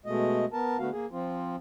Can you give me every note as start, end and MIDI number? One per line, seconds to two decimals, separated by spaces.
0.06 0.45 47
0.06 0.45 56
0.06 0.45 57
0.06 0.45 75
0.53 0.77 59
0.53 0.77 70
0.53 0.77 81
0.79 0.90 50
0.79 0.90 57
0.79 0.90 59
0.79 0.90 66
0.79 0.90 77
0.92 1.06 58
0.92 1.06 68
1.11 1.56 53
1.11 1.56 60
1.11 1.56 65